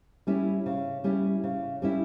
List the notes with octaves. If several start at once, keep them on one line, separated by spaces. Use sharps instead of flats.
G3 C#4 E4
C#3
G3 C#4 E4
C#3
G3 C#4 E4